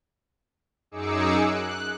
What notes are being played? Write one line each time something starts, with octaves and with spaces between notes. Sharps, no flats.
F#2 D#4 G#4 D6 E6 C#7
F#6